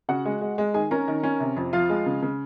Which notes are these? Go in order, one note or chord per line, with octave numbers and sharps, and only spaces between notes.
C#3 F#4 F#5
G#3
G#3
G#3
D#3 G#4 G#5
C#4 A#4 A#5
D#3
C#4
C3
F2
F3 F4 F5
G#3
C#3
C#3